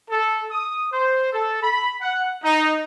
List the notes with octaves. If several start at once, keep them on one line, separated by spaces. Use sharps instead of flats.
A4
D#6
C5
A4
B5
F#5
D#4